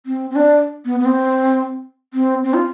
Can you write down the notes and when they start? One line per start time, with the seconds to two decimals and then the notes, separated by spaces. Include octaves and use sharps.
0.06 C4
0.30 C4
0.36 D4
0.85 B3
1.00 B3
1.05 C4
2.14 C4
2.44 C4
2.54 F4